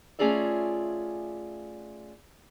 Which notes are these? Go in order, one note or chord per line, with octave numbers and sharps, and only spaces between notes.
A3 C#4 F4 G#4 D5 E5